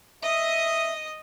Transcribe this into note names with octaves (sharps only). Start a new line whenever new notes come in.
D#5 E5 D#6